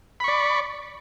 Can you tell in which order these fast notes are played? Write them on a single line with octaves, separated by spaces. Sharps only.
B5 C#6 D5